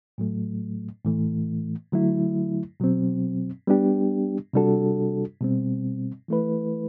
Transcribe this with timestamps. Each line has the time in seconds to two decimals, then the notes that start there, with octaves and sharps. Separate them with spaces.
0.18 A2 F#3 A3
1.05 A2 E3 A3
1.92 D3 F#3 A3 E4
2.80 B2 F#3 C4
3.67 G3 B3 D4 G4
4.53 C3 G3 D4 F#4 A4
5.41 B2 G3 C4
6.28 E3 A3 E4 B4